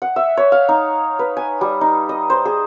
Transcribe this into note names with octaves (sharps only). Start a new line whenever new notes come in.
F#5
E5
C#5
F5
D#4
B4
G#5
G3
D#4
D#5
C5
G#4